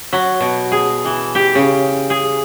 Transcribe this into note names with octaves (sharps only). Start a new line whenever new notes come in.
F#3
B2
G#4
E3
G4
C#3
G#4